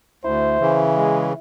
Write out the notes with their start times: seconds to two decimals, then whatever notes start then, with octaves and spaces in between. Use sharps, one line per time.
0.24 D2 E4 C5
0.60 C#3 E3
0.95 G#3